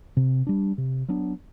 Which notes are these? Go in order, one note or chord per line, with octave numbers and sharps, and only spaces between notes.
C3
G3 D4
C3
F#3 B3 D4